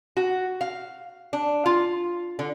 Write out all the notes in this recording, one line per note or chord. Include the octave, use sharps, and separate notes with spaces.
F#4
F5
D4
F4
D3